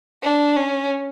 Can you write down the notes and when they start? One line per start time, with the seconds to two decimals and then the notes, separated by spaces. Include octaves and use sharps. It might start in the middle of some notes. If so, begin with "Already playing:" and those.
0.23 D4
0.57 C#4